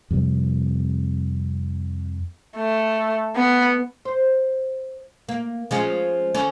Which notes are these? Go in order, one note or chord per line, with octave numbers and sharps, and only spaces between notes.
F2 C3 G3
A3
B3
C5
A#3
F3 G#3 C#4
D3 C#4